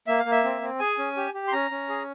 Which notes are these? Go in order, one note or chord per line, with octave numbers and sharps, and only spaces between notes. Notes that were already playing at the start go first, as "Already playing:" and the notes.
A#3 E5
F5
A#3
E5
C4
C4
G#4 G#5
C#4
G4
G4
C6
C#4 A#5
C#4
G#4